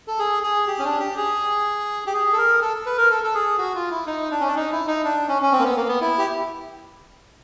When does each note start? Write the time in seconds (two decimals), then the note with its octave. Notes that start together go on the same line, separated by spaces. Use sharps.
0.07 A4
0.19 G#4
0.43 G#4
0.67 G4
0.79 C#4
0.84 D4
1.00 G4
1.17 G#4
2.07 G4
2.14 G#4
2.33 A4
2.38 A#4
2.62 A4
2.86 B4
2.98 A#4
3.11 A4
3.24 A4
3.35 G#4
3.58 F#4
3.75 F4
3.91 E4
4.07 D#4
4.31 D4
4.40 C#4
4.47 D4
4.56 D#4
4.72 E4
4.87 D#4
5.04 D4
5.28 C#4
5.42 C#4
5.52 C4
5.59 A#3
5.64 B3
5.77 A#3
5.88 B3
6.01 E4
6.18 G4